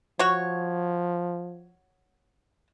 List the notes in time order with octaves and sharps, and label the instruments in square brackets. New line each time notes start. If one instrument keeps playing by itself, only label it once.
[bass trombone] F3 [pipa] F#4 C#5